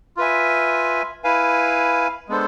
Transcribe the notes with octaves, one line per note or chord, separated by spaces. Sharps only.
F4 B4 E5 G#5
E4 B4 F5 G#5
G#3 B3 D4 A4 C5